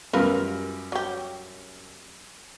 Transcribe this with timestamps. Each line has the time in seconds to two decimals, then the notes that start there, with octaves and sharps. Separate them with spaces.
0.13 F#2 G3 F4 A#4 B4 F6
0.92 F#3 G4